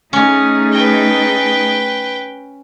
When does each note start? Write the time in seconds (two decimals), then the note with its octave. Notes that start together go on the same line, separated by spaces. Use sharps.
0.13 A3 C#4 D#4 G#4
0.72 B4 G5